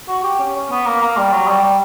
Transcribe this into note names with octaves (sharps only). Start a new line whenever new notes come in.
F#4
G4
C#4
C#4
B3
A#3
A#3
G3
F#3
G3
G3